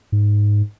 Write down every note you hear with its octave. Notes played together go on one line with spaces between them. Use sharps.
G#2